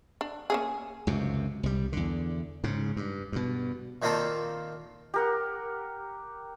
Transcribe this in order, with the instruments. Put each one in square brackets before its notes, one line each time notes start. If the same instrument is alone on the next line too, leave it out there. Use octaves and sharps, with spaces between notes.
[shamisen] D4
A#3 C#4 G#4
[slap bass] C#2 F#2 C3
C2 G3
E2 D3
G#2 C#3
G2
G2 B2
[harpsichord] A#2 D#3 A#3 C4 F4 A4
[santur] G4 A#4 F#5